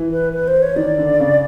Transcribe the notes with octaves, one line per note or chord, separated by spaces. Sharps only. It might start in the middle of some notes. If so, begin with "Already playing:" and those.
Already playing: E3
B4
B4
C5
C#5
D#3 D5
D3
C#3